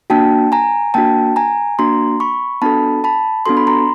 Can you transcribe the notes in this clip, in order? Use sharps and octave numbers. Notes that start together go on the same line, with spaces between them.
A#3 D4 F#4 G5 A5
G#5 A#5
A#3 D4 F#4 G5 A5
G#5 A#5
A#3 D4 F#4 A#5 C6
B5 C#6
B3 D4 F#4 A4 A5 B5
A5 B5
B3 D4 F#4 A4 C6
B5
A#5 C6